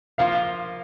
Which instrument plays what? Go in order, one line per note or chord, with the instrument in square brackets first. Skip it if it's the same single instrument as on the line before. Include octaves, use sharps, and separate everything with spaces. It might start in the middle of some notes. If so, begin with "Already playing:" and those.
[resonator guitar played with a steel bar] F3 A#3 F4 [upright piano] F5